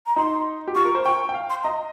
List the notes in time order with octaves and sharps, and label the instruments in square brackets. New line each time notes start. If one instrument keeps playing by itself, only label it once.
[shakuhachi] A#5
[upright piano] D#4 [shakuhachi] C6
[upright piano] G4
[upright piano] F4 [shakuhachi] C#6
[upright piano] A#4
C5
[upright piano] G5 [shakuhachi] C#6
[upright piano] G5
F5
[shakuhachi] C6
[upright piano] D#5 [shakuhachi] A#5